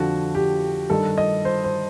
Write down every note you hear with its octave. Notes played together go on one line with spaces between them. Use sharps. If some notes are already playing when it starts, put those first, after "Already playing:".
Already playing: F2 D3 F3 F#4
G4
G2 D#3 A4
D#5
C5
C5